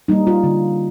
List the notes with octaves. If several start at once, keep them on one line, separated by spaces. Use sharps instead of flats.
G3 A#3 D#4
F4
D3